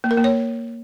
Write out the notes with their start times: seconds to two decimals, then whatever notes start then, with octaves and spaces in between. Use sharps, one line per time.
0.04 A#3
0.11 A#4
0.17 A#3
0.24 C#5